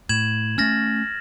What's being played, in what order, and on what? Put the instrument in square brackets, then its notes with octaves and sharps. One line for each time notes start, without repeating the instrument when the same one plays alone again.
[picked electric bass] A2 [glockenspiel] G#6 E7 F#7
[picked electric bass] A3 C#4 [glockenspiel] F6 A6 A#6